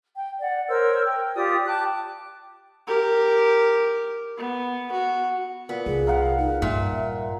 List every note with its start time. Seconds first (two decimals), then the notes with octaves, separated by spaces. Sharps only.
0.15 G5
0.40 D5 F#5
0.69 A#4 C5 C#5 E6
1.05 G5
1.35 F4 G4 D5 D#6
1.66 G5 A5 D6 F#6
2.87 G4 A#4
4.37 B3
4.92 F#4
5.69 A#2 B3
5.86 C2 G#4
6.07 A#4 F5 F#5
6.38 D#4
6.62 A#1 G2 A#2 E5